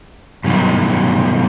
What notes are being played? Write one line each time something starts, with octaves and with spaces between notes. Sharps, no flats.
G2 B2 D#3 F#3